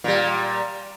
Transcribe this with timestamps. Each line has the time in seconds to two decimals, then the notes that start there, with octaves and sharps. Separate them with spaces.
0.04 A#2 G3